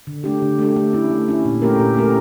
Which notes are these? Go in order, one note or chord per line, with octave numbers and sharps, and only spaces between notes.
D3
A3 D4 G4
D3
A3 D4 G4
A3
C#4 E4
A3
C#4 E4
A#2
A3 C#4 G4 A#4
A#2
A3 C#4 G4 A#4